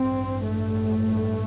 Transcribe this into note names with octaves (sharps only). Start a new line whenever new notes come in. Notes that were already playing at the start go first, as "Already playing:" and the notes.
Already playing: A1 G2 C4
A3